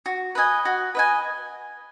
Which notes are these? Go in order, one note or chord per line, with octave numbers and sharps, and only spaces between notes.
F#4
B4 D#5 G#5
F#4
B4 D#5 G#5